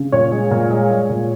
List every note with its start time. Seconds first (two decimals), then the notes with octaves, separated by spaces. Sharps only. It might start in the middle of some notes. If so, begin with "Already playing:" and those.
Already playing: C#3
0.12 A#2 C#5
0.32 G#3
0.51 A#2
0.70 G#3
0.90 G#3
1.10 A#2